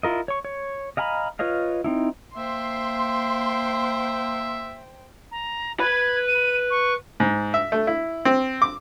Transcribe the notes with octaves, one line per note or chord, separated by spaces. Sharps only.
E4 F4 A#4 D#5
C#5 C#6
C#5
D#5 F5 G#5 A#5 B5
F4 B4 C#5 D#5 F5
C4 D#4 E4
A#3 C5 E5 G5 C6
A#5
B4 B5 G#6
D#7
C#6
G#2
E5
A3
E4
C4
D6